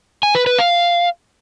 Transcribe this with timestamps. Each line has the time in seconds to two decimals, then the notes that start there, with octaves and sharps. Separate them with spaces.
0.23 G#5
0.35 B4
0.47 B4
0.58 F5